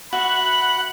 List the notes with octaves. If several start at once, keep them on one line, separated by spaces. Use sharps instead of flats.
F#4 E5 F#5 B5